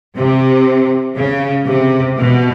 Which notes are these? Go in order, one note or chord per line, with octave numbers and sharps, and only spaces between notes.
C3
C#3
C3
B2